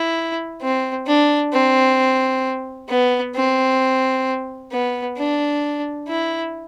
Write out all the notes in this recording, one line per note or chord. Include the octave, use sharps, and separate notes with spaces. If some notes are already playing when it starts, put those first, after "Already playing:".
Already playing: E4
C4
D4
C4
B3
C4
B3
D4
E4